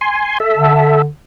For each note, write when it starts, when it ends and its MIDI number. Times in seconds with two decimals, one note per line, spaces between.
0.01 0.38 80
0.01 0.38 84
0.40 1.02 69
0.40 1.02 76
0.58 1.08 50